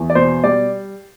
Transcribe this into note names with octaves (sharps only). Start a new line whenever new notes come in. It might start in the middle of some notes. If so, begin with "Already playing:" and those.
Already playing: E2
D5
B2 C5
G3 D5